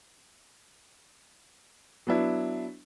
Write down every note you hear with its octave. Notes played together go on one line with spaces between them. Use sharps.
F#3 B3 D4 E4